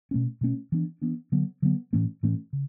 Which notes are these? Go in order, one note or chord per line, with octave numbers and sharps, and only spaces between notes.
B2 A3 C#4
B2 A3 C#4
E3 B3 D4
E3 B3 D4
D3 F#3 B3
D3 F#3 B3
A2 E3 A3 C#4
A2 E3 A3 C#4
C#3